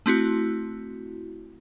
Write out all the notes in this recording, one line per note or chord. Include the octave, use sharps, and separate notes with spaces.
A3 C4 E4 F#4